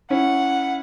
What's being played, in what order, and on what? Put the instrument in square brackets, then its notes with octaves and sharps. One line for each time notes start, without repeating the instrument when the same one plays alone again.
[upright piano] C#4 E4 [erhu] F#5